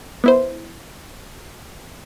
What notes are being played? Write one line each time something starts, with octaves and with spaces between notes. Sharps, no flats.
B3 E4 C5